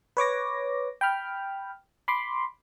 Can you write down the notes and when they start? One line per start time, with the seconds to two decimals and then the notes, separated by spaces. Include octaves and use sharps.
0.17 B4 C#5 D6 A#6
1.01 G5 B5 F6
2.08 B5 C6 D6